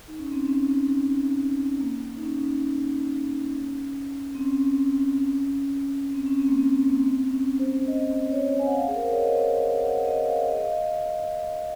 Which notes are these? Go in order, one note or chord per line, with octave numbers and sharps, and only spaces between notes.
D#4
C#4
C4
C#4
A#3
D#4
C#4
C4
C#4
C4
C#4
C4
A#3
C4
A#3
C4
C#4
C5
D#5
C#5
G#5
F#5
F5
G#4
A#4
C5
C#5
D#5
F#5
D#5
F5
D#5
F5
D#5